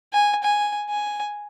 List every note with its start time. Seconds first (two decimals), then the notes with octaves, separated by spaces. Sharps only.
0.13 G#5
0.43 G#5
0.90 G#5